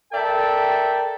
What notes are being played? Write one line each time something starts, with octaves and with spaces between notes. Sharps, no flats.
A4 A#4 D5 E5 G5 A5